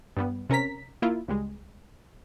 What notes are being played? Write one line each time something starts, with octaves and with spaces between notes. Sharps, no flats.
G2 G3 B3
C3 C#4 A#4 A#5 B6
A#3 E4 F4
C#2 G3 G#3